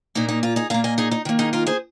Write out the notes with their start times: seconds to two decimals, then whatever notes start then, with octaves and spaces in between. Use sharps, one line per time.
0.15 A#2 A#3 D#4
0.29 D#4
0.43 F4
0.56 D#4 G#4
0.70 A#2 A#3 F5 A#5
0.84 D#5 G#5
0.98 D#4 G#4
1.11 D#4
1.25 D#3 A#3
1.39 D#4 G#4
1.53 F4 A#4
1.67 G#4 C5